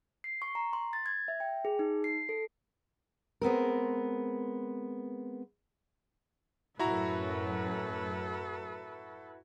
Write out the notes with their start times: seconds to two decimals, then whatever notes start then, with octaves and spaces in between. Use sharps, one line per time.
0.24 C7
0.42 C#6
0.55 A#5
0.73 C6
0.93 A6
1.06 G#6
1.28 E5
1.40 G5
1.65 G#4
1.79 D#4
2.04 C7
2.29 A4
3.41 G#3 B3 C4 A#4
6.79 F#2 A2 E4 F#4 A4 B4 A#5